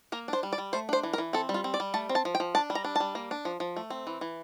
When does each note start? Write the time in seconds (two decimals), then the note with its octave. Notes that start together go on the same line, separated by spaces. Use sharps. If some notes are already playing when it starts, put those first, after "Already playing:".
0.12 A#3 A#4
0.28 D4 C5
0.43 G3
0.53 D5
0.58 G3
0.73 A3 C5
0.89 D4 C5
1.03 E3
1.13 A#4
1.18 E3
1.33 C4 A4
1.49 G3
1.54 F4
1.64 C4
1.74 D5
1.80 G3
1.94 A3 A5
2.09 C4
2.15 A5
2.25 F3
2.35 G5
2.40 F3
2.55 D4 A5
2.70 G3
2.75 A#5
2.85 D4
2.96 G3 A5
3.15 A#3
3.31 D4
3.45 F3
3.60 F3
3.76 A3
3.90 C4
4.07 E3
4.21 E3